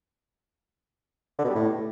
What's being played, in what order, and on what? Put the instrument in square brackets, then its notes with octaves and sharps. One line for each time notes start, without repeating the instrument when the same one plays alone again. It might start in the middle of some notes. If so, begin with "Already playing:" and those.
[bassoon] D3
B2
G3
A2